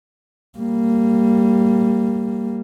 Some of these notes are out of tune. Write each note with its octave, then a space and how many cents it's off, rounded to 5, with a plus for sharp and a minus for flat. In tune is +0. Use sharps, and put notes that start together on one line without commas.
G3 +0 A#3 -15